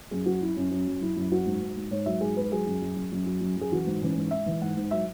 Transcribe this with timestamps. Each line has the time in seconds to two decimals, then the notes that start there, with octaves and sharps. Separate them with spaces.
0.11 F#2 G#4
0.26 F#3 F#4
0.41 F#3 E4
0.56 F#2 C#4
0.71 F#3 C#4
0.87 F#2
1.01 F#2 E4
1.16 F#2
1.32 F#3 F#4
1.46 G#2
1.61 G#2
1.76 G#2
1.91 G#2 C#5
2.06 F#3 E5
2.21 G#2 G#4
2.37 G#2 B4
2.51 F#3 G#4
2.66 F#2
2.82 F#2
2.96 F#2
3.12 F#2
3.26 F#3
3.41 F#2
3.57 F#2 G#4
3.71 E3 F#4
3.86 G#2
4.01 E3 C#4
4.17 G#2
4.31 G#2 E5
4.46 E3
4.61 G#2 F#5
4.76 G#2
4.91 F#3 E5